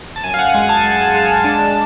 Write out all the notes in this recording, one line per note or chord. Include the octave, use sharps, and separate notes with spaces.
A5
F#2 G#5
F5
F#5
F#5
G#3 G#5
A5
G#3
G#3
D4